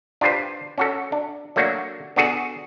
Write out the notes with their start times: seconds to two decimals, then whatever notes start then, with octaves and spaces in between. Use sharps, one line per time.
0.21 D4 F4 G4 B4 C5
0.78 C#4 F#4 A4
1.12 D4
1.56 F#3 A3 A#3 D4 F#4
2.16 B3 D4 F#4 G#4 A4